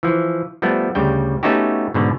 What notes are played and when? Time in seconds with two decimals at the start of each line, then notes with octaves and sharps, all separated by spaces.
0.03 E3 F3
0.62 F3 G3 A3 B3
0.95 D2 C#3 G3 G5
1.43 A3 B3 C#4 D#4 F#4 G4
1.94 G#2 B2 D3